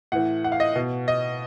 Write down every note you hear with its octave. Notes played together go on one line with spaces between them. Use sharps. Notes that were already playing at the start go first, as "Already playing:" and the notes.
A2 E3 F#5
F#5
F5
D#5
B2
D#5